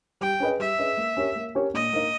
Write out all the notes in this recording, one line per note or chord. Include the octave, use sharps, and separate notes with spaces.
G3 G5
C#4 G#4 B4 D#5
G3 E5
C#4 G#4 B4 D#5
A#3
C#4 G4 A#4 C#5
A#3
C#4 G4 A#4 C#5
A#2 D#5
A#3 D#4